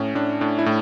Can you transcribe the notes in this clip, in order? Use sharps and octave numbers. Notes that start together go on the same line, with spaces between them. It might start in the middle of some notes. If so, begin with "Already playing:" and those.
Already playing: A2 C#4
A2 D4
A2 D4
E4
A2